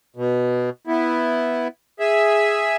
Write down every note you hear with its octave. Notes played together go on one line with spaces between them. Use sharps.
B2
B3 E4
G#4 E5